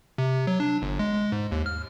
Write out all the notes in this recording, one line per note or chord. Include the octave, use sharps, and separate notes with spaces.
C3
F#3
D4
G1
G#3
G#3
G#2
D#2
F6